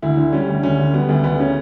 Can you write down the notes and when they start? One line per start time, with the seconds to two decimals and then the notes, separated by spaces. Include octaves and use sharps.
0.02 D2 E4
0.17 D3
0.33 G3 C#4
0.49 D2
0.63 D2 C#4
0.79 D3
0.94 G3 B3
1.09 D2
1.24 D2 B3
1.40 C#3 C#4